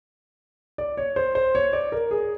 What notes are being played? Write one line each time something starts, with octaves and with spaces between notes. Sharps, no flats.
D5
C#5
C5
C5
C#5
D5
A#4
G#4